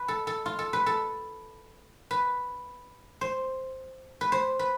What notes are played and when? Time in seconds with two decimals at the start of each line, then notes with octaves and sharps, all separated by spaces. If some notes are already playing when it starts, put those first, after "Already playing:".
Already playing: B4
0.08 A4
0.27 A4
0.46 F4
0.59 A4
0.73 B4
0.86 A4
2.11 B4
3.21 C5
4.21 B4
4.32 C5
4.59 B4